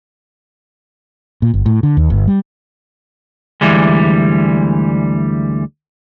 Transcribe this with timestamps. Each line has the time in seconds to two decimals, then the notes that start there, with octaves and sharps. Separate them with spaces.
1.42 A#2
1.54 G1
1.66 A2
1.83 D3
1.97 D#2
2.10 G1
2.28 G3
3.61 D2 E3 G3 G#3